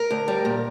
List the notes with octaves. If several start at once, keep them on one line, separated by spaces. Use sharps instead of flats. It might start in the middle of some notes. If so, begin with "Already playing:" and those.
Already playing: A#4
D2
G3
A#2